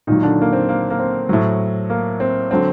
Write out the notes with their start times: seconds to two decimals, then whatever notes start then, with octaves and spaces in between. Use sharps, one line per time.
0.07 A#2 D#3 F#3 D#4
0.23 D3 D4
0.41 A#3
0.53 C4
0.69 A#3
0.90 A#3
0.99 C4
1.29 A2 F#3
1.90 A#3
2.20 C4
2.51 D3 F#3 C4